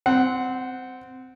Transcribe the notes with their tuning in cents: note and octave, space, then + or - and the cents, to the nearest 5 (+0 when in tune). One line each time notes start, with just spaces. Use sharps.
C4 -15 F#5 +0